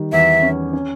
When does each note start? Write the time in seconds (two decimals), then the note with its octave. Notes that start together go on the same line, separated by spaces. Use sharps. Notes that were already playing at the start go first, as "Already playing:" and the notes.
Already playing: D#3 G3
0.12 E2 E5
0.43 C#4
0.73 C#4